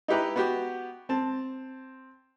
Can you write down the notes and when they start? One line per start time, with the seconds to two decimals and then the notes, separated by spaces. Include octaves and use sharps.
0.08 D#4 E4 G4 B4 A#5
0.36 B3 F#4 G4
1.09 C4 A5